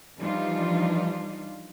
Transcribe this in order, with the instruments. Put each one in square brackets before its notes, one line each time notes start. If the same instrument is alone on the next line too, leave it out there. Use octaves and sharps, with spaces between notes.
[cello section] E3 F3 G3 D4 D#4 F4